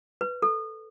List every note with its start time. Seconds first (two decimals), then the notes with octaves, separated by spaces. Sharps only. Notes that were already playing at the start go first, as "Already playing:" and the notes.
0.21 B4
0.42 A4